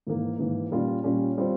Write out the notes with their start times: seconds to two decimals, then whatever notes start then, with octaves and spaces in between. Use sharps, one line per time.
0.07 G#2 E3 A#3
0.39 G#2 E3 A#3
0.71 A#2 G3 C#4 F4
1.04 A#2 G3 C#4 F4
1.38 G3 C4 F4 C5